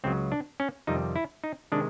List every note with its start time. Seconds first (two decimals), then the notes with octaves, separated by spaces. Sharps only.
0.04 C#2 C#3 F#3 C4
0.32 D4
0.60 C#4
0.87 F2 C3 D#3 G3 D#4
1.16 E4
1.44 D#4
1.72 C3 D#3 G#3 D4